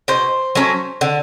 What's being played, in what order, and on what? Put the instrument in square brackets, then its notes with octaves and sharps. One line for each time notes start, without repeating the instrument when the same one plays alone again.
[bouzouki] B2 C5
F#3 A3 C#4
D3